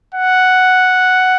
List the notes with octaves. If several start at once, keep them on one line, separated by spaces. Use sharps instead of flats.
F#5